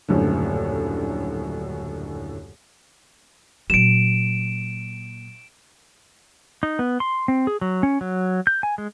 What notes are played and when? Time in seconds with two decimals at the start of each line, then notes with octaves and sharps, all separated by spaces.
0.08 D#1 F#2 A2 D3
3.70 A#2 F#3 D7 E7
6.63 D#4
6.79 B3
7.00 C6
7.28 C4
7.47 G#4
7.61 F#3
7.83 C#4
8.01 F#3
8.47 G6
8.63 G#5
8.78 G#3